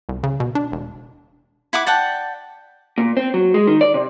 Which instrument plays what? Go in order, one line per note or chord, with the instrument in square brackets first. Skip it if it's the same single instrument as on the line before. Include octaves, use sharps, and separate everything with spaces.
[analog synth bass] C2
C#3
B2
D4
E1
[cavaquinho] E4 F#5 B5 D6
D5 F#5 G5 A5
[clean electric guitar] A#2
C4
F#3
G#3
D#3
D5
C3